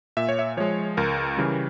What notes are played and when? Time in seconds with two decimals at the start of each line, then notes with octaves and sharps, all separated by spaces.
0.17 A#2 E5
0.29 C#5
0.39 E5
0.57 F3 G#3 C#5
0.97 C#2 A#4
1.37 C#3 E3 G3